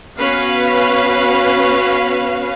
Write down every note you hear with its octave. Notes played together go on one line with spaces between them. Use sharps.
B3 C#4 F#4 B4 F5